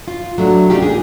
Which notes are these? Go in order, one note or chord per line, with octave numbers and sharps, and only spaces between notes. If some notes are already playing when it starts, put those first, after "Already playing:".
F4
F#3 A3 D4
C#3 D4 D#4 F4 G4
G#3 A#3 G#4